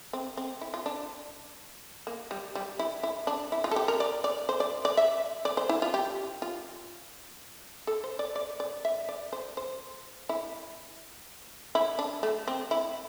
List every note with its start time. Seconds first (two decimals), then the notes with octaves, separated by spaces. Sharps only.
0.13 C4
0.37 C4
0.61 E4
0.74 F4
0.86 D4
2.07 A#3
2.31 G3
2.55 G3
2.79 E4
3.03 E4
3.27 D4
3.52 E4
3.64 F4
3.71 A4
3.76 G4
3.88 A#4
4.00 D5
4.24 D5
4.49 C5
4.60 D5
4.85 D5
4.97 E5
5.45 D5
5.57 C5
5.69 E4
5.82 F4
5.94 G4
6.42 F4
7.87 A4
8.04 C5
8.19 D5
8.36 D5
8.60 D5
8.85 E5
9.09 D5
9.33 C5
9.57 C5
10.29 E4
11.75 E4
11.99 D4
12.23 A3
12.48 C4
12.71 E4